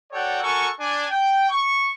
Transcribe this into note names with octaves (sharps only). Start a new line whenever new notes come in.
F#4 A4 C#5 D5 F#5 G5
F#4 A4 A#4 G#5 C#6
D4 G#5
G5
C#6